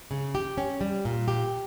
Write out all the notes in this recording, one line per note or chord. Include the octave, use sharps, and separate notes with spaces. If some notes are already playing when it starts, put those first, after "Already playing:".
C#3
G4
C#4
G3
A#2
G4